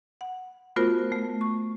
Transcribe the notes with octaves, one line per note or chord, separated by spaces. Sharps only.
F#5
A3 B3 F4 F#4 A#4 C5
A3
C#6